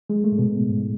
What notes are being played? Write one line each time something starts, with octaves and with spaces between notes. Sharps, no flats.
G#3
A3
A2
B2
G#2